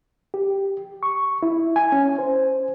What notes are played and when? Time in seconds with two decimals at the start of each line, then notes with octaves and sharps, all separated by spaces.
0.34 G4
1.03 C#6
1.43 E4
1.76 G#5
1.92 C#4
2.19 C5